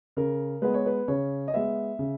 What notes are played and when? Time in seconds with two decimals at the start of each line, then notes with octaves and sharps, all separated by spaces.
0.17 C#3 A#4
0.62 G#3 B3 B4
0.74 C#5
0.86 B4
1.08 C#3 C#5
1.48 D#5
1.54 G#3 B3 E5
1.99 C#3